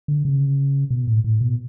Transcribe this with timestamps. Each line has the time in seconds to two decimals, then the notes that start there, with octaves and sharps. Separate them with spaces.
0.08 D3
0.25 C#3
0.90 B2
1.07 A2
1.24 A2
1.41 B2